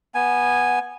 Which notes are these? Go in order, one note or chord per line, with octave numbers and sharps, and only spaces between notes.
B3 G#5